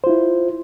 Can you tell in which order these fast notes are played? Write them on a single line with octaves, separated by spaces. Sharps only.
C5 F4 E4